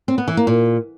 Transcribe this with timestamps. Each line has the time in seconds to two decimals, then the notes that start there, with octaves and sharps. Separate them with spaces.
0.08 C4
0.18 B3
0.28 E3
0.37 A#3
0.47 A#2